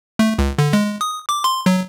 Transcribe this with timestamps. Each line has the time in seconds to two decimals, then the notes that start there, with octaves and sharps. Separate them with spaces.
0.19 A3
0.39 C#2
0.58 D3
0.73 G#3
1.01 D#6
1.29 D6
1.44 C6
1.66 F#3